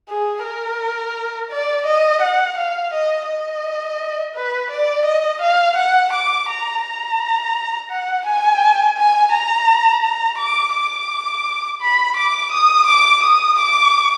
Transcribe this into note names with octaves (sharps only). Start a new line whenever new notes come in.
G#4
A#4
D5
D#5
F#5
F5
D#5
D#5
B4
D5
D#5
F5
F#5
D6
A#5
A#5
F#5
G#5
G#5
A#5
A#5
D6
D6
B5
D6
D#6
D6
D#6
D6